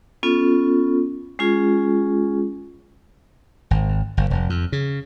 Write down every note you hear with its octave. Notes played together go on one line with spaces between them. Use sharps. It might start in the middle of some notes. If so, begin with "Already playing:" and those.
B3 C#4 F4 A4
G#3 C#4 F4 G#4
G#1
G1
F1
F2
C#3